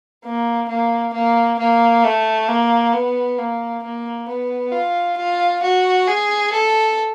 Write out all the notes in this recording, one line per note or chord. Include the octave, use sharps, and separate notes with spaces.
A#3
A#3
A#3
A#3
A3
A#3
B3
A#3
A#3
B3
F4
F4
F#4
G#4
A4